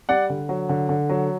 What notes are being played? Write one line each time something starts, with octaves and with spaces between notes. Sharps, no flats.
G3 D5 F#5
D3
F#3
D3
D3
F#3